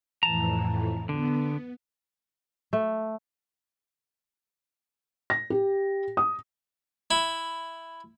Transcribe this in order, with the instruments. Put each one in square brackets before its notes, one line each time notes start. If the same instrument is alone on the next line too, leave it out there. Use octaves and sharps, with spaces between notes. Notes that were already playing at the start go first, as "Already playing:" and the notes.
[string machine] F2 A2 E3 [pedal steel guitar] A5 A#5
[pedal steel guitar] D3 [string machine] B3
[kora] A3
[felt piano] A#6
G4
D#6
[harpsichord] E4